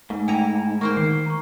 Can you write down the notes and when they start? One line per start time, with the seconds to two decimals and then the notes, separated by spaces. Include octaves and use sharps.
0.10 G#2 A3
0.28 E4 G5 A#5 D#7
0.81 A#3 C5 G5 C#6
0.97 D#3 C7
1.26 A#5 C#6